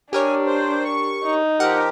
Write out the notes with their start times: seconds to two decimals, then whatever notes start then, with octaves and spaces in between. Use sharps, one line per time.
0.13 D4 G4 A#4 C#5 G#5
0.46 C5
0.84 C#6
1.24 D#4
1.60 F3 G4 A#4 F#5